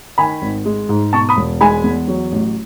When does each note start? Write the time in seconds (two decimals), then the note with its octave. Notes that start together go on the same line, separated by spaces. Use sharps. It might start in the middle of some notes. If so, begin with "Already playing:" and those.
0.18 D#3 G#5 B5
0.42 G#1
0.66 G#3
0.89 G#2
1.13 B2 A5 C#6
1.29 B5 D#6
1.37 E1
1.61 G#3 G#5 B5
1.84 E2
2.08 F#3
2.32 A1